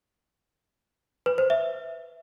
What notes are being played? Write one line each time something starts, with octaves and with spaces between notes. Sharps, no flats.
B4
C5
E5